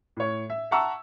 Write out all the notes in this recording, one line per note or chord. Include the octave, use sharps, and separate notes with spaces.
A2 C#5
E5
E5 F#5 A5 A#5 C#6 E6